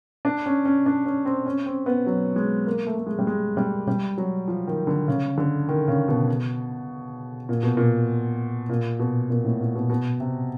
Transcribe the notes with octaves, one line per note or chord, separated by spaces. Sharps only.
D4
C#4
C#4
D4
C#4
C4
C#4
C4
B3
F#3
G#3
A#3
A3
A3
G#3
G3
G#3
G3
G3
F#3
F3
D#3
D3
C#3
D3
D#3
C#3
B2
A#2
B2
A#2
A#2
B2
A#2
A2
A#2
B2
B2
C3